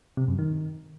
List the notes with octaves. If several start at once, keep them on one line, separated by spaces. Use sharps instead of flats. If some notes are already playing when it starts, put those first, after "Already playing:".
C3
F#2
D#3